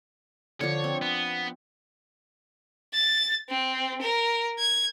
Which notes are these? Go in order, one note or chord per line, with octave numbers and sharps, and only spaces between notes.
D3 F3 D4 C#5
C4
B3
A6
C4
A#4
G#6